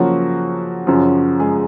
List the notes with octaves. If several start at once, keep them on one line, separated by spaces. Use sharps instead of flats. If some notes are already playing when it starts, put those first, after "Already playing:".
Already playing: C#3 F3 F#3 A#3 F#4
F#2 C#3 F3
G#3 G#4